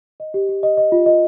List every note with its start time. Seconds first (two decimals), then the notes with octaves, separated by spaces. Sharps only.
0.20 D#5
0.34 G4
0.49 G4
0.63 D#5
0.77 D#5
0.92 F4
1.06 D#5